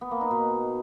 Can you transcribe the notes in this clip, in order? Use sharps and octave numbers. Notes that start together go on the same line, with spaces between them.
B3
A#3
D#4
B2